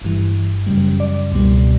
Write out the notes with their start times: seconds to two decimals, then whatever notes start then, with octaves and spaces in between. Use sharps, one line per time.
0.02 G1 G2 E3
0.66 F#2 C#3 G3
1.00 D5
1.32 C#2 B2 G3